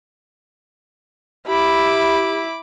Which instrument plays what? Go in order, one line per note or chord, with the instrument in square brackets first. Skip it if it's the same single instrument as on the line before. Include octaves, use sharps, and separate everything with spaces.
[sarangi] E4 [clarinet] G4 [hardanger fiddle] B5 D6